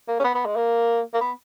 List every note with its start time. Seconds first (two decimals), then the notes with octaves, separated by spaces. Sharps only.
0.08 A#3
0.20 C#4
0.24 B3
0.35 B3
0.46 G#3
0.56 A#3
1.14 A#3
1.21 B3